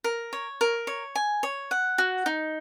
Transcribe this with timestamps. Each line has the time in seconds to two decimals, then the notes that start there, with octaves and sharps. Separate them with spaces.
0.04 A#4
0.33 C#5
0.61 A#4
0.87 C#5
1.15 G#5
1.43 C#5
1.71 F#5
1.98 F#4
2.26 D#4